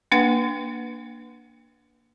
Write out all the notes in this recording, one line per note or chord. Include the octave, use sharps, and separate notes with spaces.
A#3 D4 B4 F#5